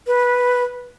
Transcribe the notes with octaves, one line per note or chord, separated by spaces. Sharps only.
B4